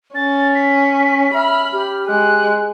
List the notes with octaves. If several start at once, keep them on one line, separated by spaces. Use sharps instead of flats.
C#4 A6
B6
E5 B5 F6
G4 F6
G#3 F#6